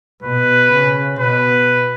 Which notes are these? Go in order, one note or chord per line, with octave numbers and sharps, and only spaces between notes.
B2 B4
C#3
B2 B4